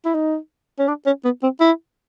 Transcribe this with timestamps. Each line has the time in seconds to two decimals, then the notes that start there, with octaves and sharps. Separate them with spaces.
0.05 E4
0.15 D#4
0.79 C#4
0.88 D4
1.06 C#4
1.24 B3
1.43 C4
1.60 E4